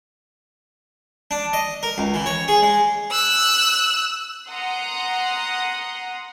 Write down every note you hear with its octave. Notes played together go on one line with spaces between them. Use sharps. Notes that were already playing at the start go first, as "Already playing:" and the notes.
D4
D#5
A#4
C#2
E3
C#5
G#4
G#3
E6 F#6
F#5 A#5 C6 D#6